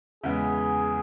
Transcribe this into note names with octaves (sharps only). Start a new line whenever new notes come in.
E2 C#3 G#3 B3 G#4